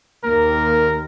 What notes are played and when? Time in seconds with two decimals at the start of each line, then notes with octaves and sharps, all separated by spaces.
0.24 D#2 A#3 A#4